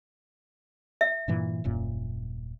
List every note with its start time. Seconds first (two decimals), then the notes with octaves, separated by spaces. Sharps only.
1.01 E5
1.28 G2 A#2 E3
1.64 D#1 F#2 A#2